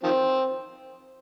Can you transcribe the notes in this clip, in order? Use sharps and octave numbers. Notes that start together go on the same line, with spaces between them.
D#3 F3 C4